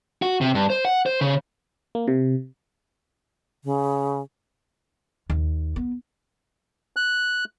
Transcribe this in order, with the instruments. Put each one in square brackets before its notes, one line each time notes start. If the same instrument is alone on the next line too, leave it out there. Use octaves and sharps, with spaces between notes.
[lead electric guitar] F#4
C3
G2
C5
F#5
C5
C#3
[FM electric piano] A#3
C3
[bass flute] C#3
[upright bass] D#2
B3
[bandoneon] F#6